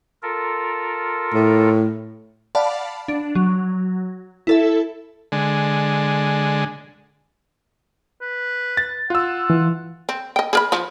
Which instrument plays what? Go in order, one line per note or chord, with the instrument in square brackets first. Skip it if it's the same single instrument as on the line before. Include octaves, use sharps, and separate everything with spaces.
[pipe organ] F4 A4 A#4
[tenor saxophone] A2
[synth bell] D5 F5 F#5 A5 B5
D4
F#3
E4 A4 E5
[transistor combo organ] D3 G#3
[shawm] B4
[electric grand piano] A6
[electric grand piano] F4 E6 [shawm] F#5
[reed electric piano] E3
[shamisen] C4
D#5 G5
G#4 A#4 B5
F3 F4